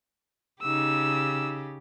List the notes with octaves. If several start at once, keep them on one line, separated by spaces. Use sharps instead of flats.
C#3 D#4 G4 E6